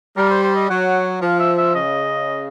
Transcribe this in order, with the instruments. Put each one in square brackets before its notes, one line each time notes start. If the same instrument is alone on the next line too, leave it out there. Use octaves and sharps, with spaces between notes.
[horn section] G3 [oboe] A#4
[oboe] C5
C5
D#5
[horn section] F#3 [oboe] F#5
[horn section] F3 [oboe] F5
[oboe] E5
E5
[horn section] C#3 [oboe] D#5